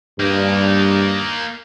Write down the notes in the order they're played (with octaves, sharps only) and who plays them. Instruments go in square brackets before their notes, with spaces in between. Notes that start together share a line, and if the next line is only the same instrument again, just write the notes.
[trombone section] G2 [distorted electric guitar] A#3 D#4